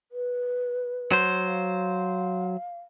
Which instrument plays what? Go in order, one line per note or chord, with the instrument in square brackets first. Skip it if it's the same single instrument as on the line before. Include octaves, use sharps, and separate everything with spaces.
[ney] B4
[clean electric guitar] F#3 C5
[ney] F5